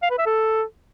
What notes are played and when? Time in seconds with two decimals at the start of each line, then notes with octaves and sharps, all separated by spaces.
0.02 F5
0.10 B4
0.18 E5
0.26 A4